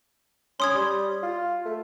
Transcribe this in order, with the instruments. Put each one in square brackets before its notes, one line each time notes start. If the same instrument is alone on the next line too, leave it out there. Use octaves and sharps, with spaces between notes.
[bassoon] C#4 [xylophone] C6 D#6 G#6
[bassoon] G3
F4
A3